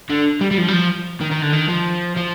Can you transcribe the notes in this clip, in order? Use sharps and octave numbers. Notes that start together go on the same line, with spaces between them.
D3
G3
G3
F3
G3
F3
D#3
D#3
D3
D#3
F3
F3